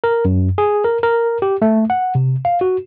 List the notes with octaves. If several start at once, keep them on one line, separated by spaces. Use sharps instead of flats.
A#4
F#2
G#4
A#4
A#4
G4
A3
F#5
C3
F5
F#4